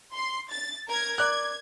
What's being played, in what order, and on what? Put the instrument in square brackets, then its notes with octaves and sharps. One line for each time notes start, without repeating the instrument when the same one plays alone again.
[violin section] C6
A6
A#4 G#6
[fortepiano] D5 F#6 [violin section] G#6